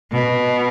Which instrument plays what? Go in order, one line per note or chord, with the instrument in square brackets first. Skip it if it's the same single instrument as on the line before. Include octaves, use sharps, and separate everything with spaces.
[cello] B2